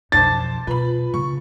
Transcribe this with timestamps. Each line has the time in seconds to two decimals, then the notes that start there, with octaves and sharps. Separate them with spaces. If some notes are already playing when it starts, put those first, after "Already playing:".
0.12 B1 F2 C5 A5 D6 A6
0.67 B2 F4 B4 B5
1.14 C#3 A#3 C#6